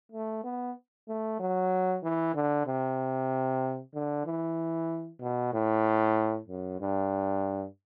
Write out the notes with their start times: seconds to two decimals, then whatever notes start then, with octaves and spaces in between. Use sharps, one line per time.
0.12 A3
0.44 B3
1.08 A3
1.40 F#3
2.03 E3
2.35 D3
2.67 C3
3.94 D3
4.26 E3
5.21 B2
5.53 A2
6.48 F#2
6.81 G2